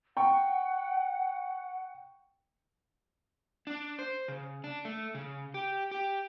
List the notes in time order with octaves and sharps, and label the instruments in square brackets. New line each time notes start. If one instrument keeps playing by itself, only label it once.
[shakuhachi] F#5 [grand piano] G5 C#6
[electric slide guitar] D4
C5
C#3
D4
A3
C#3
G4
G4